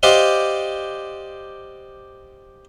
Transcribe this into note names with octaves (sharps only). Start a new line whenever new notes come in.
G4 C5 D5 D#5 F5 F#5